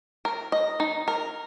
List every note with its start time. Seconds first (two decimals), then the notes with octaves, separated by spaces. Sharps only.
0.25 A#4
0.52 D#5
0.80 D#4
1.08 A#4